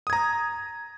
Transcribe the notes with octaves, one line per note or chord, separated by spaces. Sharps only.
A#5 D#6 G#6